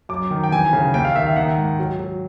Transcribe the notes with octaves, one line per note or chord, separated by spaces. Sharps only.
F#2 D6
D#3
G5
E3 G#5
C#3
D#2 G5
F5
D#3 E5
F5
D#3 F#5
G#2
F#3
F#3